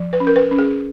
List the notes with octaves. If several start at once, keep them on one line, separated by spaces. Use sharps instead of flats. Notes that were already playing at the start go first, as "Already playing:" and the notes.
Already playing: F3
B4
C#4
A#4
B4
C#4
G#4